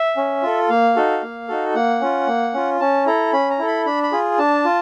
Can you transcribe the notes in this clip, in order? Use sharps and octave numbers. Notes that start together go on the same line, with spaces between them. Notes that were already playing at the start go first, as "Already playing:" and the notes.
Already playing: E5
C#4
F4 A4
A#3 F5
D#4 F#4 A4
A#3
D#4 F#4 A4
A#3 F#5
C#4 F4
A#3
C#4 F4
C#4 A5
E4 A4 A#5
C#4 B5
A#5
E4 A4
B5
D4 B5
B5
F4 G#4
D4 A5
F4